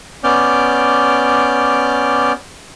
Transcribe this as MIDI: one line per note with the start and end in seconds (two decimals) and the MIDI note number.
0.24 2.32 59
0.24 2.32 61
0.24 2.32 74
0.24 2.32 86
0.24 2.32 89
0.24 2.32 91